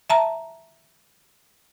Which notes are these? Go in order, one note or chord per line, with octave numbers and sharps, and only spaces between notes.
E5 A5 A#5